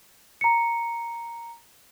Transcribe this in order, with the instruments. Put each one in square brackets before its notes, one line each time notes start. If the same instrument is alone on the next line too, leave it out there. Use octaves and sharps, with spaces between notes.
[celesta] A#5 C#7